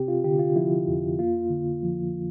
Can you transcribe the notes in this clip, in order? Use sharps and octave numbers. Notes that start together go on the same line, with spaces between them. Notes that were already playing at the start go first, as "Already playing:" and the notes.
Already playing: C3 C4 G4
F4
D3 G4
F4
F3 E4
F2
A#3 F4
D3
F3